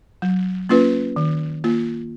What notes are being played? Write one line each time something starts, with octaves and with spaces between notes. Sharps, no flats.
F#3
A#3 C#4 F4 B4
D#3
A#3 F4